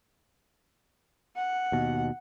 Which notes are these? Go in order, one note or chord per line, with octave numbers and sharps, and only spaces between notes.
F#5
D#2 B2